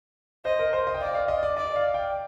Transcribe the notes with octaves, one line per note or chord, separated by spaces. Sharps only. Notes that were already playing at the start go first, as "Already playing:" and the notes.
C5 D#5
A#4
C5
D#5
G5
D5 F5
F5
D#5
D5
D5 D#5
F5
G5